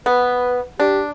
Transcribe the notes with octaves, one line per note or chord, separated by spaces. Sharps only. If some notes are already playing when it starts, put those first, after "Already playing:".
B3 B4
D4 G4